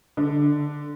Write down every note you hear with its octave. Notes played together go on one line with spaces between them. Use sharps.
D3